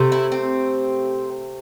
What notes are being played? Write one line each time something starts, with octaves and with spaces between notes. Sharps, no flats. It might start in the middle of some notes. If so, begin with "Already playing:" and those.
Already playing: C3 A3
E4
C4